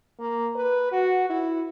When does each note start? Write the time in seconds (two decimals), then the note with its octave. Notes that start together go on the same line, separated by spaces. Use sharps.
0.19 A#3
0.55 B4
0.92 F#4
1.29 E4